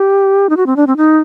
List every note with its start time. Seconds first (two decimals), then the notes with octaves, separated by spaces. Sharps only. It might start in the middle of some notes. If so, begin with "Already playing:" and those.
Already playing: G4
0.50 D#4
0.57 F#4
0.66 C4
0.76 D4
0.87 C4
0.97 D#4